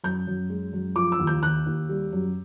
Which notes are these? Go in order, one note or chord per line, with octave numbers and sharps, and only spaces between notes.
F#2 G6
F#2
G#3
F#2
F3 D6
E6
D#2
G6
D#2 F#6
D#2
G3
F#2